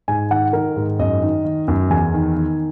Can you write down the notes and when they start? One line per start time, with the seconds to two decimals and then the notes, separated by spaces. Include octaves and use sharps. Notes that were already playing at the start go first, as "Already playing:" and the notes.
0.08 G#2 G#5
0.31 D#3 F#5
0.53 D#3 A#4
0.76 G#2
0.99 F#2 D#5
1.22 D#3
1.45 D#3
1.68 F#2
1.90 E2 G#5
2.14 D#3
2.37 D#3